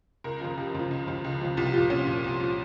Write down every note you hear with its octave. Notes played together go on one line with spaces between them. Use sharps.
C#2 A#4
C#3 F3
C#2 G4
C#3 F3
C#2
C#3 F3
C#2
C#3 F3
C2 F4
G4
A#2 F3 F4
C2 C#4
A#2 F3
C2
A#2 F3